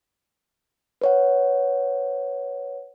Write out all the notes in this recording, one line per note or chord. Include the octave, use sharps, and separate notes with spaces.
B4 C#5 F#5